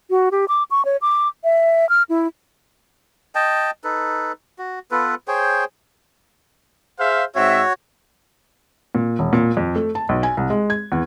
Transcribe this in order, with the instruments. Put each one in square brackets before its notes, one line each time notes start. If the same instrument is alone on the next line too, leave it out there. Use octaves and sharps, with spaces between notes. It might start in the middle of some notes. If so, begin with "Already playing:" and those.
[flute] F#4
G4
D6
C#6
C#5
D6
E5
F6
E4
[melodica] D#5 G5 A5
D#4 A4 B4
F#4
B3 F4 A4 B4
G#4 C5 C#5 G5
[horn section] G#4 E5 F5 [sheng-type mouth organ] C5
[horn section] G#2 C4 E5 [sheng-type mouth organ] F#4 C#5
[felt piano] A#2
E1
A#2
F2
A3
A5
B1
G#5
C2
G#3
G#6
E2